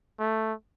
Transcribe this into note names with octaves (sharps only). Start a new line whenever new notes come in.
A3